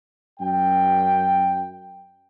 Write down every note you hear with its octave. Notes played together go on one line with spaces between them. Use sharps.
F#2 G5